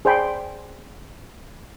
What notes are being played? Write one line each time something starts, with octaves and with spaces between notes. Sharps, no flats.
G#4 C5 D5 G5 B5 C6